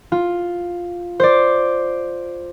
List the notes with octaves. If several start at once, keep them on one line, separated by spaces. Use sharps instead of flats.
F4
C5 D5